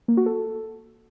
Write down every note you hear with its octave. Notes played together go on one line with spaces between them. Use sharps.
A#3
F#4
A4